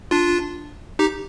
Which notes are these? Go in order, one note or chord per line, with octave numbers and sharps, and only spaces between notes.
D4 F4
D#4 G4